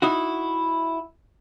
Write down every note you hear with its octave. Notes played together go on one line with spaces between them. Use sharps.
D#4 E4 F#4